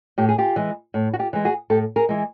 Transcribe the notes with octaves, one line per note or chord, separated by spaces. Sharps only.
A2 G4
G#4
F4 G4
E3 G#3
A2
F#4
F4 G4
E3 G#3
F#4 G#4
A2 G4 A4
G#4 A#4
E3 G#3